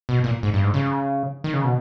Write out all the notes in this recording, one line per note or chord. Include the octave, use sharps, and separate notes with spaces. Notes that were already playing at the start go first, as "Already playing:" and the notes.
B2
A#2
G#2
G2
G#2
C#3
D#3
C#3
B2